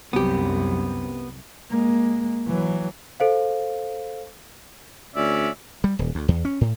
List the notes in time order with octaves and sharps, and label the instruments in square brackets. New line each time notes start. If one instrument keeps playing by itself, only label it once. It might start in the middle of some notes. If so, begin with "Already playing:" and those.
[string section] C2 F#2 [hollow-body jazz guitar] B3 G4
[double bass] G#3 A#3
E3 F#3
[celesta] A4 C5 F5
[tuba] D2 [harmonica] C#4 D5 E5
[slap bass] G3
D#1
D2
E2
C#4
A2